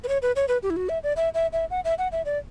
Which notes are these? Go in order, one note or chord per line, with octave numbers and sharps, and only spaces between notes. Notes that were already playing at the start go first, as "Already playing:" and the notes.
B4
C#5
B4
C#5
B4
G4
E4
F#4
E5
D5
E5
E5
E5
F#5
E5
F#5
E5
D5